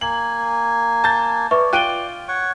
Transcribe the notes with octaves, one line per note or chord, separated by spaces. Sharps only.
A#3 G#5 F#7
A5 G6 A6
B4 D5 E5 C#6
F4 G5 F#6 D7 D#7 G7
C#5 F#5 C#6